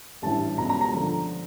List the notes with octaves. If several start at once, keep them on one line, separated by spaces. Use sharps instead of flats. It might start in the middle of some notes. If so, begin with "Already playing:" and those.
A1 G2 E3 A5
C#2 B2 A#5
A#5
A#5
D3 F3